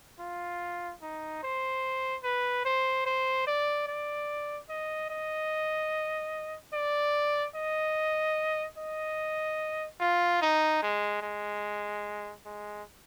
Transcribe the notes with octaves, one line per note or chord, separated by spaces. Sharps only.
F4
D#4
C5
B4
C5
C5
D5
D5
D#5
D#5
D5
D#5
D#5
F4
D#4
G#3
G#3
G#3